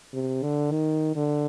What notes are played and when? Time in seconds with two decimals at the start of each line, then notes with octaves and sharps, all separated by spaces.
0.14 C3
0.43 D3
0.71 D#3
1.15 D3